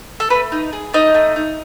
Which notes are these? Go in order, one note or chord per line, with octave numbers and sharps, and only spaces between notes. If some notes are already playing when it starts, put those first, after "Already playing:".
A4
A3 B4
D#4
G#4
A3 D#4 D#5
A3
D#4